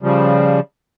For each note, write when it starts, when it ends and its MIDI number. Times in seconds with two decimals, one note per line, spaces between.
0.03 0.60 49
0.03 0.60 53
0.03 0.60 55